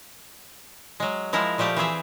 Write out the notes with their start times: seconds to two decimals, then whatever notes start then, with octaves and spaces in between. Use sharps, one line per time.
1.00 F#3 G#3
1.33 F3 G#3 E4 A#4
1.58 A#2 F3 A3 G4 D5
1.76 E3 C4 G#4 E5